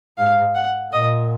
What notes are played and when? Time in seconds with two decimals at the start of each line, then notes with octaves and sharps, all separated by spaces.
0.18 G#2 F5
0.55 F#5
0.92 A#2 D#5